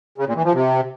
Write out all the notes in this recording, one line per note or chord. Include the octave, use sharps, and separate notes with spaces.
C#3
A#2
E3
F3
C3